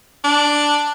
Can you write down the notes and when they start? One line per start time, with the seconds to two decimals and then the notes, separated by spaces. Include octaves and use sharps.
0.25 D4